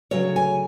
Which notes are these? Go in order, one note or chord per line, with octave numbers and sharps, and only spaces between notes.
D2 C#3 F#3 C#5
G#5